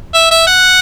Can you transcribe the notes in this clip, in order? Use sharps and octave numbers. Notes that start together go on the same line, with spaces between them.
E5
E5
F#5